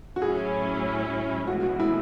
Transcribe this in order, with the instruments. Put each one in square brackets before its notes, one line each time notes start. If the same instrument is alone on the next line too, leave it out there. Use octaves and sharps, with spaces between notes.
[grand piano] F#4
[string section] A2 F#3 C#4 E4 [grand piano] G#4
[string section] B1 A2 E3 G#3 [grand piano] F#4
[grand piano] F#4
E4